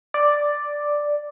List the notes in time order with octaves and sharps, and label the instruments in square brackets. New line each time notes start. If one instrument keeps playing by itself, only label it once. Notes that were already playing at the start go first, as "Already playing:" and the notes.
[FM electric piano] D5